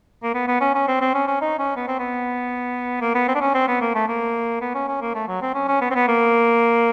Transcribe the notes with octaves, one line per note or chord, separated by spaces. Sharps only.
A#3
B3
B3
C#4
C#4
C4
C4
C#4
C#4
D#4
C#4
B3
C4
B3
A#3
B3
C4
D4
C#4
C4
B3
A#3
A3
A#3
B3
C#4
C#4
A#3
A3
F#3
C4
C#4
C#4
B3
C4
B3
A#3